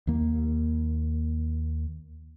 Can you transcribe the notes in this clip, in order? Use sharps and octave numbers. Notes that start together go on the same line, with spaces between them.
D#2 A#3